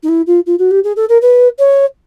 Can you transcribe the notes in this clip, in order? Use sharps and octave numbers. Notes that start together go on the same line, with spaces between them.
D#4
E4
F4
F4
F#4
G4
G#4
A4
A#4
B4
C#5